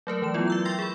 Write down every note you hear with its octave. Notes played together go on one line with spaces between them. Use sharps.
F#3 A3 A#4 B4
E3 F#3 E7
F#3 B3 E4 F4
E5 E6 G6
G5 C6 E6 A6 A#6
G#4 B5